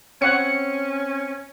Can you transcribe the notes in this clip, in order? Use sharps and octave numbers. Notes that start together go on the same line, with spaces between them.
C4 C#4 C#5 F#5 C#7